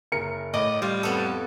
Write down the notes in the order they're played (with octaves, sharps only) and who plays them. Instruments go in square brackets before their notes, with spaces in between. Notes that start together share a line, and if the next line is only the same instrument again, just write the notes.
[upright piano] F#1 A#4 C#7
[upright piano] A2 [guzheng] D5 [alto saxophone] D#5
[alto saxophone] G3 [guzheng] F4
[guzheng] F2 B3 A4